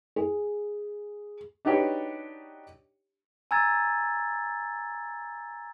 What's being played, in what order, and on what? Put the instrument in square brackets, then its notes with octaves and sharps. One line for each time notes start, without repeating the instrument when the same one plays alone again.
[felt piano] G#4
[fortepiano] D4 D#4 F#4 G4 B4 C#5
[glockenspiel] G#5 A#5 E6 G#6 A6